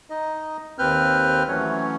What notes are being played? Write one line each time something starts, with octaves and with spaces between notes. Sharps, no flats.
D#4 D#5
D#2 C4 B4 F6 G6
E3 F#3 A3 C#4 C#5